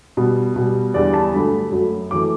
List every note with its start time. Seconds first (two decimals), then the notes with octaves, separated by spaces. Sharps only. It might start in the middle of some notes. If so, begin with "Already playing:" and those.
0.17 B2 G3
0.56 B2 G3
0.94 E2 D3 G3 D5
1.13 A5
1.33 G2 D3 F#3 A3 B5
1.72 F#2 F#3 A3
2.11 F#2 E3 A3 D6